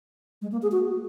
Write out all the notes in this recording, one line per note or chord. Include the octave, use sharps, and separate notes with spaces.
G#3
A#3
G#4
F#4